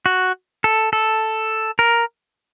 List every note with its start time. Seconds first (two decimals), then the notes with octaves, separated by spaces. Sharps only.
0.06 F#4
0.64 A4
0.93 A4
1.79 A#4